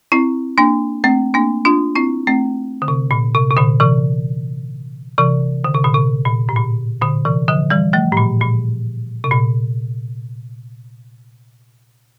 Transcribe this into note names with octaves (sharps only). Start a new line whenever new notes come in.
C4 E4
A#3 D4
A3 C4
A#3 D4
D4 F4
C4 E4
A3 C4
D3
C3
A#2
C3
C3
A#2 D3
C3 E3
C3 E3
D3
C3
A#2 D3
C3
A#2
A2
A#2
A#2 D3
C3 E3
D3 F3
E3 G3
F3 A3
A2
A#2
A#2
C3
A#2